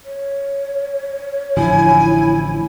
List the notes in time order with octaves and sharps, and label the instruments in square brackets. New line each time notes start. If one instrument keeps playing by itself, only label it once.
[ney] C#5
[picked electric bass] A1 D3 F3 [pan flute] E4 [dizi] G#5